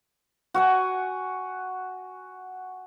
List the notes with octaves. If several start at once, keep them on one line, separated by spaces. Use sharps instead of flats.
F#4 F#5 G#5